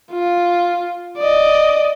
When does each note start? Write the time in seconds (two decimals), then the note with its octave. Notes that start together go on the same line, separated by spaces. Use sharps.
0.12 F4
1.18 D5 D#5